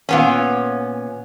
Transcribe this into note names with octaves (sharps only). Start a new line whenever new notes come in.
A#2 B3 C#4